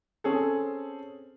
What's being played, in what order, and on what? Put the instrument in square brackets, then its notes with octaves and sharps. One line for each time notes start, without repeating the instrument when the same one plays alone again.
[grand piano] C4 C#4 G#4 A4